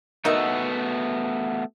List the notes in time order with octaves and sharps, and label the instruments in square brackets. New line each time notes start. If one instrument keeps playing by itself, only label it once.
[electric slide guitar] A3 B3 F#4 [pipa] D#4 A#4 E5